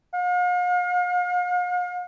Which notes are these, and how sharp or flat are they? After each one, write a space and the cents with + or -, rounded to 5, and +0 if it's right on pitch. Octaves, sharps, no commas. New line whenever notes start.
F5 +45